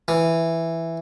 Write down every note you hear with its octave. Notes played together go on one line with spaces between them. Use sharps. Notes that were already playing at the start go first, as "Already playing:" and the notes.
E3